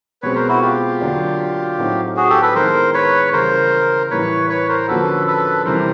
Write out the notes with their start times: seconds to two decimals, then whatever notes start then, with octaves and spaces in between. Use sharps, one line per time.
0.22 B2 G#3 C4 B4 C#5
0.35 A#4 C5
0.48 E4 F#4
0.61 F4 G4
1.01 D3 F#3 A#3 D4
1.78 A2 F#3 A3 C4 D#4
2.17 F#4 G#4
2.29 G4 A4
2.42 A4 B4
2.55 D#3 G#3 B3 E4 A#4 C5
2.94 B4 C#5
3.33 C#3 E3 G3 A#4 C5
4.11 A2 E3 G3 A#3 B4 C#5
4.49 B4 C#5
4.69 A#4 C5
4.88 D3 F3 A#3 C#4 F#4 A4 B4
5.27 A4 B4
5.66 C3 E3 G3 A#4 C5